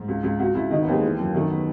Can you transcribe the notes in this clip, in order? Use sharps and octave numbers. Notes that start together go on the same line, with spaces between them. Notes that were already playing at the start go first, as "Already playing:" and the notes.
Already playing: G#2
C#2
C#2
C#2 F#4
C#2 E4
D#3 D#4
B3
D#2
G#3
E3
F#2
D#3 A3
B3